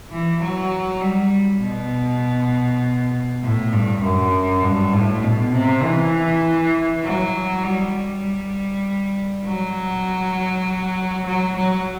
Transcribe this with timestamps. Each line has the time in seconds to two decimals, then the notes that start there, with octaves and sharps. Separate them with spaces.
0.11 E3
0.41 F#3
1.01 G3
1.61 B2
3.42 A2
3.73 G2
4.03 F#2
4.63 G2
4.93 A2
5.23 B2
5.53 C3
5.83 E3
7.04 F#3
7.64 G3
7.95 G3
9.45 F#3
11.26 F#3
11.56 F#3